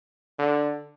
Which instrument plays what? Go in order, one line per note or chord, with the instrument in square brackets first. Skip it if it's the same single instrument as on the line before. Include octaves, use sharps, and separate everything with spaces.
[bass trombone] D3